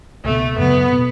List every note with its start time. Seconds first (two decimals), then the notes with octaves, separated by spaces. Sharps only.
0.24 C#2 B2 A3 B3
0.58 F#2 C#3 F#3 B3
0.92 B2 B3